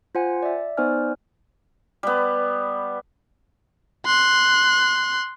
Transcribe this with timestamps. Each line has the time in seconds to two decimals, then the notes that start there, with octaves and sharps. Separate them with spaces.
0.15 F4 C5 F#5 G#5
0.43 D5 E5
0.77 B3 D#4 C5 D5 G#5 F6
2.03 G3 B3
4.05 C6 F#6